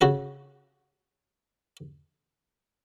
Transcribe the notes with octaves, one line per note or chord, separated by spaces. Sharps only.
C#3 F#4 A4